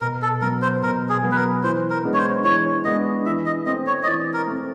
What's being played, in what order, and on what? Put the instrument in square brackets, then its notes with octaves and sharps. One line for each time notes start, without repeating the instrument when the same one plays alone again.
[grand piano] B2 [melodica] A#4
[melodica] A4
[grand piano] F#3 B3 [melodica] A#4
[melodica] C5
[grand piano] B2 [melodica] A#4
[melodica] G#4
[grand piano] F#3 B3
[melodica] B4
A#4
[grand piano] E3 [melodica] C5
[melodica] A#4
[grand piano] G#3 B3 D4
[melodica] C#5
C5
[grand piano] E3 [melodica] C#5
[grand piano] G#3 B3 D4 [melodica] D#5
[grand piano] E3 [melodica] E5
[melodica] D#5
[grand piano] A3 C4 [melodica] D#5
[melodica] C#5
D#5
[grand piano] E3 [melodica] D5
[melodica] A#4
[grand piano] A3 C4